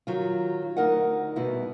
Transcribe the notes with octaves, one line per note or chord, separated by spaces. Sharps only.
D#3 F#3 F4
D2 D#4 A#4 D#5 F#5
G2 B2 D#4 E4